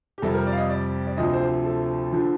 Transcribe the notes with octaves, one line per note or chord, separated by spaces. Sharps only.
G4
F2 C3 G3 A4
A#4
D5
F5
D#5
D5
D5
D2 C3 F3 D#5
C5
A4
D3 F3